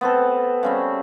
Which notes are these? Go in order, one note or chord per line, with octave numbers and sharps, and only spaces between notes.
B3 C4 A4
C#3 G3 C4